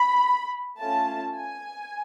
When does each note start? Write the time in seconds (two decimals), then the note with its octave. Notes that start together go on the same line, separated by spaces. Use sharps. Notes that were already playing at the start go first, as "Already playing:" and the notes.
Already playing: B5
0.79 A3 C#4 F4 A5
1.36 G#5